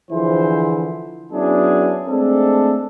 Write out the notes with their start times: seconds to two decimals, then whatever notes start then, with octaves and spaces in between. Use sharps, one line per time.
0.11 D3 E3 F3 E4 G#4 C5
1.31 F#3 B3 C#4 D4 E4 G#4
2.08 G#3 A3 C4 D4 G#4 A4